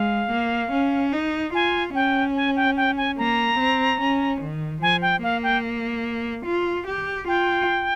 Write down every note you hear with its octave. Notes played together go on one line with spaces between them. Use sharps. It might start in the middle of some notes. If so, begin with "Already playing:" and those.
Already playing: G#3 F5
A#3
C#4
D#4
F4 G#5
C#4 G5
G#5
G5
G5
G#5
A#3 A#5
C4
C#4
D#3
F3 G#5
G5
A#3 F5
G5
F4
G4
F4 G5